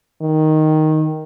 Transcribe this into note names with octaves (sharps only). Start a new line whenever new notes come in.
D#3